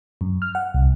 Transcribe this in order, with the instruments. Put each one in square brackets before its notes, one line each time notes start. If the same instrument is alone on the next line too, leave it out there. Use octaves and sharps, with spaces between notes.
[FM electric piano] F#2
F6
F#5
C2